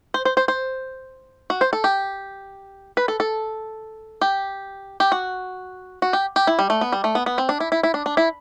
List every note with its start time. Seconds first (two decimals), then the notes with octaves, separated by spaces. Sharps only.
0.14 C5
0.25 C5
0.37 C5
0.48 C5
1.50 F#4
1.61 C5
1.73 A4
1.84 G4
2.97 B4
3.08 A4
3.20 A4
4.21 G4
5.00 G4
5.12 F#4
6.02 F#4
6.13 G4
6.36 G4
6.47 E4
6.59 G3
6.70 A3
6.81 B3
6.92 G3
7.04 A3
7.15 B3
7.26 B3
7.38 C4
7.49 D4
7.60 E4
7.72 E4
7.83 E4
7.94 D4
8.06 D4
8.17 E4